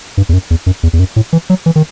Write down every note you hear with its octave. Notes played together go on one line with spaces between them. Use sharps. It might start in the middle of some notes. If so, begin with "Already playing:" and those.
G2
E2
F#2
E2
F#2
E2
E2
F#2
A2
E3
F#3
E3
D#3